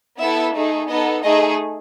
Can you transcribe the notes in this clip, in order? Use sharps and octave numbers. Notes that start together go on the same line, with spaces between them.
B3 E4 A4 E5
A3 D#4 G#4
B3 D#4 A4 D#5
A3 D#4 G#4 D#5